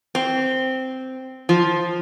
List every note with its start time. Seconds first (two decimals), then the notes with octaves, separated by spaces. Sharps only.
0.15 C4
1.49 F3